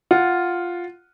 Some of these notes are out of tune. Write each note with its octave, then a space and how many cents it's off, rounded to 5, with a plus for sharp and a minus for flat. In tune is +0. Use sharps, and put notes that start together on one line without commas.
F4 +0 F#5 +0